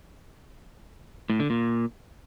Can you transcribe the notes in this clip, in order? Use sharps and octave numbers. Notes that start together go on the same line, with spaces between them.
A2
D3
A#2